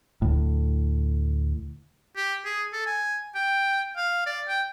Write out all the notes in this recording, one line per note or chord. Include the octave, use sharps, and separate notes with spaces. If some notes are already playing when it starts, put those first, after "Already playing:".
D2 A2
G4
G#4
A4
G#5
G5
F5
D5
G5